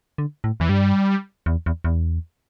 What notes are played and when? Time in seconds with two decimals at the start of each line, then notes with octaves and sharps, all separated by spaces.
0.18 D3
0.44 A2
0.60 E2 E3
0.69 G2 G3
1.46 E2
1.66 E2
1.84 E2